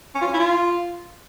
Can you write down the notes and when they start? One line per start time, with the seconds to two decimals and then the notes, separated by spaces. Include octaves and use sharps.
0.15 C#4
0.21 F4
0.27 C#4
0.34 E4
0.40 F4